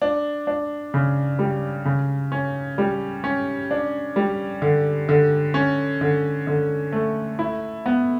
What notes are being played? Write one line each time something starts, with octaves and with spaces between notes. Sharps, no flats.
D4
D4
C#3
G3
C#3
C#4
G3
C#4
D4
G3
D3
D3
C#4
D3
D3
A3
E4
B3